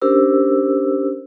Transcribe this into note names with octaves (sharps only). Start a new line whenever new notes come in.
C#4 D4 G4 A#4 C5 E6